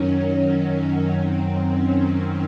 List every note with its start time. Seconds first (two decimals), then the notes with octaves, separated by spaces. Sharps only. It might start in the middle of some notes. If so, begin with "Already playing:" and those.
Already playing: F#2 D#3 F#3 C#4
0.11 C#4
0.63 C#4
1.15 F#2 D#3 F#3 C4
1.68 C#4